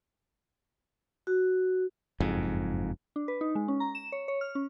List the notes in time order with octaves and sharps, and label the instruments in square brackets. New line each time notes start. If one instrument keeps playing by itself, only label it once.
[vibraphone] F#4
[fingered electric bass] F#1 F2 G#2
[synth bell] D4
B4
D#4
G#3
C#4
A#5
E7
C#5
C#5
F6
C#4